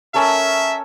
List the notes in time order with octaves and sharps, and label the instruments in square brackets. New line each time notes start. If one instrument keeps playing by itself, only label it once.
[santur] C#4 A4 A#4 [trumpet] E5